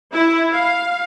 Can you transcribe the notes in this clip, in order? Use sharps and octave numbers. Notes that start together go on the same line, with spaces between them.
E4
F5